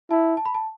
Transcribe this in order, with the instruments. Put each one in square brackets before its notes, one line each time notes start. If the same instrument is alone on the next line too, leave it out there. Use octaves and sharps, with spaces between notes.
[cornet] E4 [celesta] A5
[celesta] A5
B5
A5